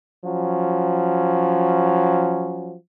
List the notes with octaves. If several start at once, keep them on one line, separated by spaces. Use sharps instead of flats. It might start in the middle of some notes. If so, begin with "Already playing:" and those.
F3 F#3 C#4